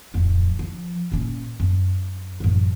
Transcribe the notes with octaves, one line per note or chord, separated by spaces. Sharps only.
D1 F2
F3
A#2 C#4
F#2
A1 F#2